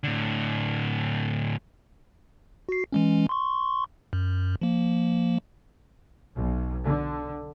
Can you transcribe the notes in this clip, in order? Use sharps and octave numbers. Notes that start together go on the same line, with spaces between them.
A2 D3
F#4 C7
E3 G#3 C#4
C6 C#6
F#2
F3 A#3
B1
D3